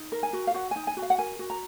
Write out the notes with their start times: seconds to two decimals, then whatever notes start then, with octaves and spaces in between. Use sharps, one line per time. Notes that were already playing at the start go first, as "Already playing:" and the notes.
Already playing: D#4
0.12 A#4
0.23 G#5
0.33 F#4
0.47 F5
0.54 F#4 F#5
0.71 D#4 G#5
0.87 G#5
0.97 F#4
1.02 F5
1.10 F#5
1.18 A#4 G#5
1.39 F#4
1.50 A#5